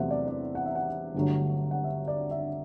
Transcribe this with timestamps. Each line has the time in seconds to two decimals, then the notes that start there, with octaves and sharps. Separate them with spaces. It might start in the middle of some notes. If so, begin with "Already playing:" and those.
Already playing: E2 C3 F#3 A3 C4 E5 F#5
0.11 D5
0.28 D5
0.55 F#5
0.66 E5
0.75 F#5
1.14 G1 G2 D3 F#3 A3
1.71 F#5
1.84 E5
2.08 D5
2.31 E5